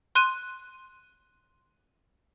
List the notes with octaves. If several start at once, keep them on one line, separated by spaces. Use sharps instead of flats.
C6 F#6 D#7